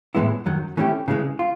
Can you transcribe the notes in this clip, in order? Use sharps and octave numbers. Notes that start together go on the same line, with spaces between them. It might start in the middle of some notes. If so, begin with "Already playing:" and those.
A2 E3 G#3 B3 E4
F#2 D#3 F#3
E3 A3 C#4 E4 G4
C#3 E3 G#3
F4